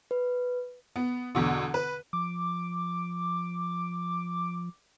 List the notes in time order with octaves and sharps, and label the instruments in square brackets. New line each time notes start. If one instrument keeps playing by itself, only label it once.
[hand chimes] B4
[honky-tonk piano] B3
E2 B2 D3
B4
[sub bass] F3 [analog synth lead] D6